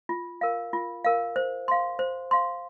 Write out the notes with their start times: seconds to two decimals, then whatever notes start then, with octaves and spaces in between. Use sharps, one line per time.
0.09 F4
0.41 A#4 F5
0.73 F4
1.05 A#4 F5
1.36 C5
1.68 F5 C6
1.99 C5
2.31 F5 C6